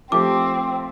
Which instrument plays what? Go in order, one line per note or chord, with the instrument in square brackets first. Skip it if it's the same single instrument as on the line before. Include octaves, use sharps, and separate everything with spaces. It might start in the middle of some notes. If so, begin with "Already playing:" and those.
[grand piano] F3 A3 G4 [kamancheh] C4 [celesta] D6